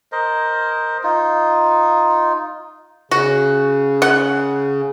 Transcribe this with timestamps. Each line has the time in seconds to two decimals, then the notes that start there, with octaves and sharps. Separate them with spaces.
0.12 A#4 C5 D#5
1.03 D#4 F4
3.11 C#3 F#4
4.02 F#5